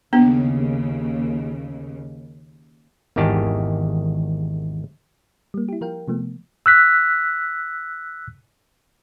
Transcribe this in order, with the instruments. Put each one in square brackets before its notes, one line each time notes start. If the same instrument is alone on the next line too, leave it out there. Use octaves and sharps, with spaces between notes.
[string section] D#2 C#3 [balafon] B3 D4
[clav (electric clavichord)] G#1 E2 D#3 G4 G#4 A5
[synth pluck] G3 A#3
E4 G4
F3 A#4 F5 G5
C3 F3 A3 B3
[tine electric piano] E6 F#6 B6